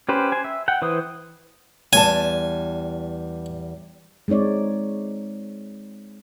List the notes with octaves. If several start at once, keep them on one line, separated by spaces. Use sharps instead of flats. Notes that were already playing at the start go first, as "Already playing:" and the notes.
C#4 G4 B4 C5
C5 G#5
E5
F#5 G5
E3 B4 C5 D#6
E2 G3 G#5 A5
G#3 C4 D#4 C#5 D5